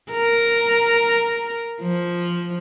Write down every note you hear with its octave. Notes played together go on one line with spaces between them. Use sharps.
A#4
F3